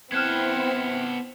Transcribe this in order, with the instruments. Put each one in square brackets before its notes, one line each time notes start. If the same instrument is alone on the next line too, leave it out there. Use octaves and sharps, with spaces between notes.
[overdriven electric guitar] B3 A4 [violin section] C4 E4 [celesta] F6 F#6 G#6